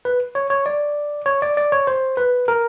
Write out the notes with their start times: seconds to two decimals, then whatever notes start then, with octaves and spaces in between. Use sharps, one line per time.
0.05 B4
0.35 C#5
0.50 C#5
0.66 D5
1.26 C#5
1.42 D5
1.57 D5
1.72 C#5
1.87 C5
2.17 B4
2.48 A#4